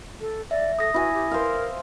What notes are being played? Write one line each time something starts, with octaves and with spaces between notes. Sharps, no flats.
A4
D5 E5
A4 D#6 A#6
E4 F#4 G#5
G4
A#4 C5 F5